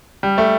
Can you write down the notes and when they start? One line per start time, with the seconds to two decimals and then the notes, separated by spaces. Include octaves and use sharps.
0.23 G3
0.38 A3